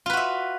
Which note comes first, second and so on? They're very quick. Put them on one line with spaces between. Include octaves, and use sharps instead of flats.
F4 B4 F#4 E5